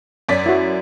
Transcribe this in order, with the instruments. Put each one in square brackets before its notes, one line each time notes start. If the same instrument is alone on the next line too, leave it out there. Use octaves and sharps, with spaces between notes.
[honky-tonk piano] F#2 D5 B6
[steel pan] E4 F#4